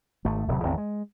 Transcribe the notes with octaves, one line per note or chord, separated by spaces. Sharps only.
G#1 A3
D1 C3 F#3
A1 E2 D#3 C4
G#3